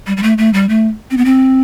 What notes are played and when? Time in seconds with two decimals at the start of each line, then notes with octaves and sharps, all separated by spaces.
0.07 G3
0.17 G3
0.23 A3
0.38 A3
0.54 G3
0.69 A3
1.11 C4
1.17 B3
1.25 C4